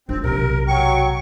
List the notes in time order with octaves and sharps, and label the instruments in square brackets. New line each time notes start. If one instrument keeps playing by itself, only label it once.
[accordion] C4 [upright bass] D4 F4
[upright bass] B1 C3 [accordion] A#4
[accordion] F#3 C#6 [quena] G5